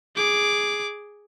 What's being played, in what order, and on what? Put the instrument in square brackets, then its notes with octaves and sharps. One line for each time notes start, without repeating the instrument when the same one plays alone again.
[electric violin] G#4 D6